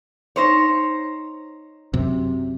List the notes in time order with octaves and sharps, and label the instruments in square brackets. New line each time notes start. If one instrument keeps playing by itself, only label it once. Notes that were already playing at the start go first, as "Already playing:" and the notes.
[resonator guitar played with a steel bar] D#4 C5 C#5
[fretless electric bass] F#2 C3